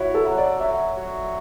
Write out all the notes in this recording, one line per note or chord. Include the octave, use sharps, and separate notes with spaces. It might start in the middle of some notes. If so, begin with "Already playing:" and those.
Already playing: E4 F#4 C#5
A4
F#3
D5
F#3 E5
F#3